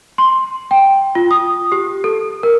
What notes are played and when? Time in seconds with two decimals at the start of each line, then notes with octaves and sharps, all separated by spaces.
0.18 C6
0.71 G5
1.15 F4
1.31 D#6
1.72 G4
2.04 A4
2.43 A#4